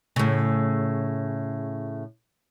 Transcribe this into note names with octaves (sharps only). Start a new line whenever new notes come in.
A2 C#3